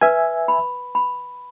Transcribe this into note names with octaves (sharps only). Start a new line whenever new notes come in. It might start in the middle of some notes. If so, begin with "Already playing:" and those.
B4 E5 G#5
B5
B5